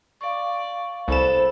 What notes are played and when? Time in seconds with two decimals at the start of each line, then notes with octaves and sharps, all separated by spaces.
0.21 D5 F5 C#6
1.08 C2 A4 B4 C5 E7